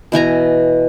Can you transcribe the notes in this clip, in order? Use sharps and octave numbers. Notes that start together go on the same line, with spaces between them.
B2 E3 G#5 A#5